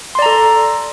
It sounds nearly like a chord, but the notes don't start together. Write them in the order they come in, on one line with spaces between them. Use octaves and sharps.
C6 D5 A#5 A4